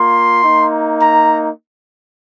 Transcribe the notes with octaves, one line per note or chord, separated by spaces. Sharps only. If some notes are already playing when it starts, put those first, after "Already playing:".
Already playing: A#3 F4 C6
A#3 D#4
A#5